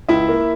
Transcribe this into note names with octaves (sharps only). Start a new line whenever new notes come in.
C#2 E4 E5
A#3